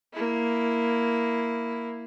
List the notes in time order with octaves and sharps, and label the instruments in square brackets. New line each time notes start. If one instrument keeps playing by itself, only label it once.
[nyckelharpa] A#3 E4